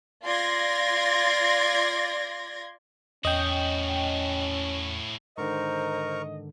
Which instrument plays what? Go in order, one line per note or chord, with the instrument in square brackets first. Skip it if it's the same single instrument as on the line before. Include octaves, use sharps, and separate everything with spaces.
[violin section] F4 D5 C6 G#6 A#6
[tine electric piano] E2 [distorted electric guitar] A2 F#4 [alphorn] C#4 [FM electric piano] D#5 G5
[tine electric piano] G#2 D3 D#3 [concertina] A#4 A#5 C#6 [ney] C5 [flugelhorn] D#5